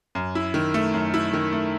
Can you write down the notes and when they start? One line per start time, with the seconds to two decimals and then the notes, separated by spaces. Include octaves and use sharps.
0.15 F#2
0.35 E4
0.54 D#3
0.74 A3
0.94 F#2
1.14 E4
1.33 D#3
1.53 A3